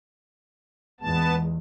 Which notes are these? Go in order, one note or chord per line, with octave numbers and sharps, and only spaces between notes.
E2 A#2 G#3 B3 A5